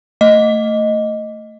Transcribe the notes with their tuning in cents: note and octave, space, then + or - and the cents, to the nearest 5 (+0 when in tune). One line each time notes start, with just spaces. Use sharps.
A3 +25 D#5 +0